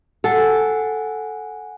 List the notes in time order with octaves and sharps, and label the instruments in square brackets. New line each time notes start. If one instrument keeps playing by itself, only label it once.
[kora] A4 [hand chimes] F#5 G#5